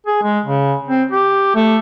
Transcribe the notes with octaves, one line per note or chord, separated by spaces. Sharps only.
G#4
G#3
C#3
C4
G4
A3